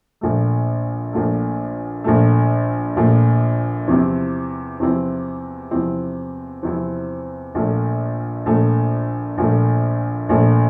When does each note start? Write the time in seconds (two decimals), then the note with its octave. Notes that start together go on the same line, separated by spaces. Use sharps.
0.21 A#1 A#2 A3
1.13 A#1 A#2 A3
2.04 A#1 A#2 A3
2.96 A#1 A#2 A3
3.87 E2 C3 F3 C4 E4
4.80 E2 C3 F3 C4 E4
5.71 E2 C3 F3 C4 E4
6.63 E2 C3 F3 C4 E4
7.55 A#1 A#2 A3
8.46 A#1 A#2 A3
9.38 A#1 A#2 A3
10.29 A#1 A#2 A3